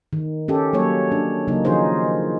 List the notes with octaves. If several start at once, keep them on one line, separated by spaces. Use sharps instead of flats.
D#3
C#4 G4 A4
F#3 G3 A#3 C#5
D4
C#3 F#3 A#3 D#4
D#3 F3 D#4 F4 G#4 C5